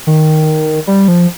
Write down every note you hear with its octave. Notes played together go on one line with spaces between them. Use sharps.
D#3
G3
F3